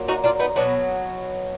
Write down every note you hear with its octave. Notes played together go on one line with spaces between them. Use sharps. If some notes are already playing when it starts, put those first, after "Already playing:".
Already playing: A#2 F#3 A#3
D#4 F#4
D4 F4
B3 D#4
B2 F#3 B3 D4